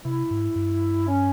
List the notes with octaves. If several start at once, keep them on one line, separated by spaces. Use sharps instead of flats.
C3 E4
G#2
G2
C#4